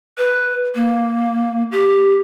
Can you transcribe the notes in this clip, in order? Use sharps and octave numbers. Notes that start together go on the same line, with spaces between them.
B4
A#3
G4